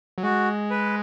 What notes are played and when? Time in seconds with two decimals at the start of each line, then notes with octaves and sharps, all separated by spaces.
0.18 F#3
0.23 G#3 F#4
0.70 B4